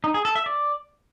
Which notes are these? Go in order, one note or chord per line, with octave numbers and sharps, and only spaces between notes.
D#4
G#4
A4
E5
D5